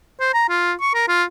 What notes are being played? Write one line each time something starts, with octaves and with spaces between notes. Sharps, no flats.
C5
A#5
F4
C#6
A#4
F4